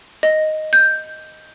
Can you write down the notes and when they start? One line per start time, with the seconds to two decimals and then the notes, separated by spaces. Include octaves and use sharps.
0.23 D#5
0.73 G6